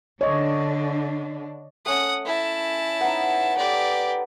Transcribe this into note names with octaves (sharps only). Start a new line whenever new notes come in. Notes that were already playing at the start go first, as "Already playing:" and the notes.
D3 D4 C#5 D#5
A3 C#4 F#5 D#6
E4 A5
B3 D#4
G4 A4 B4 D5